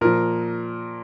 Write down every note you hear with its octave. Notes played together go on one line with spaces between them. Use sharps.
A#2 F3 A#4